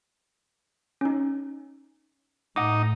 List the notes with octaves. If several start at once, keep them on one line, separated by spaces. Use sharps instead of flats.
C#4 D#4
A2 D#4 F#5 D6